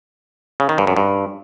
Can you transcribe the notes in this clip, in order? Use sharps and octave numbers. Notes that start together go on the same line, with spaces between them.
C#3
D#3
G2
F#2
G2